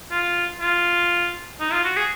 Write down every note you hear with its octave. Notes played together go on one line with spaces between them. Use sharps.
F4
F4
D#4
F4
F#4
G#4